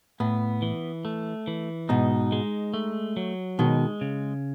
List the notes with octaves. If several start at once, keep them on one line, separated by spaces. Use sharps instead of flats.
A2 B3
E3
A3
E3
G#2 B2 D#4
G#3
A3
F#3
B2 D#3 G#3
C#3